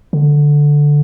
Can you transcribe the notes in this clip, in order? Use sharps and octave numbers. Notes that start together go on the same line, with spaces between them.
D3